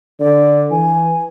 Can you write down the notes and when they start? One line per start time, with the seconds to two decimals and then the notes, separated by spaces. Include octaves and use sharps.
0.20 D3 D5
0.71 E3 G#5